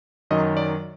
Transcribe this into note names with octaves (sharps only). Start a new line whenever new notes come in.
F#2 D#3 F#3 D#5
D5